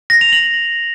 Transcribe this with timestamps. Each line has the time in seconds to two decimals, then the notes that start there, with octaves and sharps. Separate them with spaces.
0.10 A#6
0.21 F7
0.32 F#7